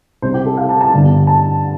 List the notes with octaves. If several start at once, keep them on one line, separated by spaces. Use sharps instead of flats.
C2 C3 G3 C5
G4
A4
F5
A5
A5
G1 G2 D3
A5